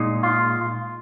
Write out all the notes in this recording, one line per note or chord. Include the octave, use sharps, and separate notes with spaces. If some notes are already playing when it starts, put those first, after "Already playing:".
Already playing: A#2 G#3 D#4
F4